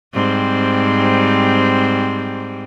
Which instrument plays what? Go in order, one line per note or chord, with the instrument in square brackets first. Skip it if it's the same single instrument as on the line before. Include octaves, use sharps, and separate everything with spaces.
[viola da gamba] G#2 G3 C4